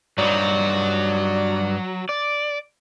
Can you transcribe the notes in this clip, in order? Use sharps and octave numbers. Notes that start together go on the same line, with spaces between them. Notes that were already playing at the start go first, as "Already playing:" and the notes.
G2 F#3 D#4 D5
D5